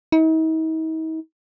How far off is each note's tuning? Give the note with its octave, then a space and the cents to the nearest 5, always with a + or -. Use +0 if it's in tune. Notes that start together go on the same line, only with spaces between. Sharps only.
D#4 +45